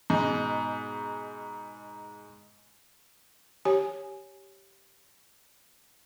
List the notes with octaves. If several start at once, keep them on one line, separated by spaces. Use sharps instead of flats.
G#2 B2
G4 C#5 G#5